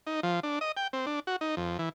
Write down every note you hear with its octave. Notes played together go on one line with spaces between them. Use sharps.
D#4
F3
D4
D#5
G5
C4
D4
F#4
D#4
F2
E3